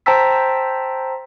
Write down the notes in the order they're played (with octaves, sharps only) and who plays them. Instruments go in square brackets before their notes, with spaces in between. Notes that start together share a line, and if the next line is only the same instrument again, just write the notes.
[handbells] C5 G5 A5 A#5 E6 B6